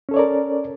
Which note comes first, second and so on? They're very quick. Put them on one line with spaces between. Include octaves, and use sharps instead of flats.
C#4 A4 C#5 D5 A#4